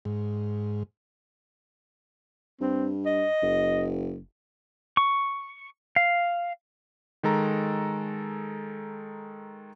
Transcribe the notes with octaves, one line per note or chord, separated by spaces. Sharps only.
G#2
G2 C4
D#5
F#1
C#6
F5
D#3 G#3 A4 A#5